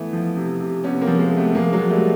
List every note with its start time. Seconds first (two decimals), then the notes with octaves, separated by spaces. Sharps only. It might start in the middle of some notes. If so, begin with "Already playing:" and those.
Already playing: E3 A3 B3
0.13 F3
0.36 C3
0.60 C3
0.84 C3 B3 C#4
1.01 A#3 C4
1.07 F3
1.19 G#3 A#3
1.31 C3
1.37 A3 B3
1.55 F3 G#3 A#3
1.73 F#3 G#3
1.78 F3
1.90 G3 A3